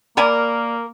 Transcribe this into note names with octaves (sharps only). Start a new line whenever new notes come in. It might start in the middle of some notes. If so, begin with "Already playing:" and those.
A#3 A#4 D5 G#5 B5